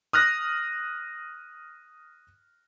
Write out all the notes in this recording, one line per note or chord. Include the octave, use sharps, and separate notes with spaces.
D#6 F6 F#6 A#6